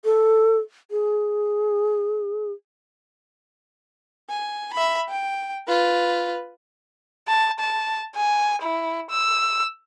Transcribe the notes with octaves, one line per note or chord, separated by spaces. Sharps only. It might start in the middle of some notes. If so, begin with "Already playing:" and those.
A4
G#4
G#5
E5 B5
G5
F4 B4
A5
A5
G#5
E4
E6